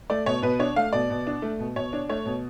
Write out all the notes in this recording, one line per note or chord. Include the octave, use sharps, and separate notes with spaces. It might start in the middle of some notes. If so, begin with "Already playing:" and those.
A3 D5
B2 C#5
B2 B4
D4 C#5
A3 F5
B2 D5
B2
D4
A3
B2
B2 C#5
D4
A3 C#5
B2